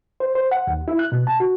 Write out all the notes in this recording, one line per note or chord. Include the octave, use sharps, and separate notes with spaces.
C5
C5
F#5
D#2
E4
F#6
B2
A5
F#4